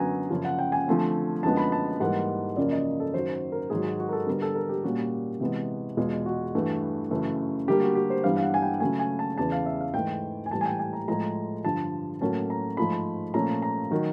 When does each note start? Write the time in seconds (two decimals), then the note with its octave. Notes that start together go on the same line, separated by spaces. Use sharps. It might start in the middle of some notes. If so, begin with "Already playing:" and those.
Already playing: F#2 D3 F#3 B3 G#5 A#5
0.30 F#2 C#3 F3
0.45 F#5
0.59 G5
0.72 G#5
0.88 D3 F3 A3 C4
1.43 F#2 D3 F3 G#3 B3 A5
1.57 B5
1.72 A5
2.00 G#2 E3 G3 A#3 F#5
2.57 F#2 C#3 F3 A#3 D5
2.72 D#5
3.00 A4
3.14 F#2 D#3 F#3 C5
3.52 A#4
3.70 G#2 D#3 F#3 G#4
3.84 F#4
3.99 F#4
4.09 A#4
4.13 A4
4.27 D3 G3 B3 A#4
4.42 A4
4.55 A#4
4.69 G4
4.83 A#2 G3 A#3 C#4 F#4
5.40 C3 E3 G#3 B3
5.97 E2 B2 G#3 F4
6.26 F#4
6.55 G2 E3 A3
7.11 F#2 C#3 E3 A3
7.67 D3 G3 A#3 G4
7.81 F#4
7.95 G4
8.10 C5
8.24 G2 E3 G3 B3 F5
8.37 F5
8.43 F#5
8.54 G#5
8.62 G5
8.80 C#3 F#3 A3 G#5
8.99 G#5
9.19 A5
9.38 E2 C#3 E3 A5
9.52 F5
9.66 E5
9.81 F5
9.94 G#2 E3 A3 G5
10.46 G#5
10.50 A2 E3 G3 A5
10.61 G#5
10.66 G5
10.79 G#5
10.93 A#5
11.08 A2 F3 G#3 A#5
11.65 G2 D3 F3 A5
12.21 A2 F#3 A#3 C#4 A5
12.50 A#5
12.77 G#2 F3 A3 B5
13.34 A#2 F3 A3 C#4 A#5
13.62 A#5
13.91 D#3 F#3